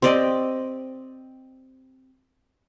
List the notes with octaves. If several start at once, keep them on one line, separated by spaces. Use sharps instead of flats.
C4 G4 D5 D#5